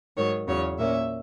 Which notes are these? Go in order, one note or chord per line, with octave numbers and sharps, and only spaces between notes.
G#2 D#3 F#3 C#5
E2 C#3 F#3 C#5
A#2 A#3 C#4 E5